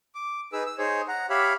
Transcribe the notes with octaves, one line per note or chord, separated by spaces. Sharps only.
D6
D#4 G#4 B4 E6
E6
D#4 G#4 C5 C#5
F#5 A#5
G4 C#5 E5 F5 B5